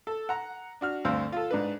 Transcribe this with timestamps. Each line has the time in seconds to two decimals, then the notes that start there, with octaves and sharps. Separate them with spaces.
0.07 A4
0.29 F#5 A#5
0.81 D4 F#4 F6
1.05 D2 G2 C4 C5 F5 E6
1.32 F4 A4
1.51 G#2 D4 B4